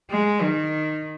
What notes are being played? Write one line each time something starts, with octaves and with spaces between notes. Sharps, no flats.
G#3
D#3